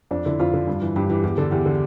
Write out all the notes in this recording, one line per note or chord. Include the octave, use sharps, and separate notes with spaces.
F2 D4
D3 E4
F2 F4
D3
G2
E3
G2 G4
E3 G4
E2 G4
D3 A4
E2 G4
D3